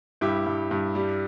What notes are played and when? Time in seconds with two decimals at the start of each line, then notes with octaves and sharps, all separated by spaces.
0.21 G2 E4 G4
0.46 G2
0.71 G2
0.95 G3